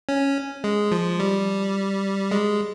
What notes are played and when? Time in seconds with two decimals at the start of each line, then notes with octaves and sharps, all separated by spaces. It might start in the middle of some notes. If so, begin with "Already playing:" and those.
0.09 C#4
0.64 G#3
0.91 F3
1.20 G3
2.31 G#3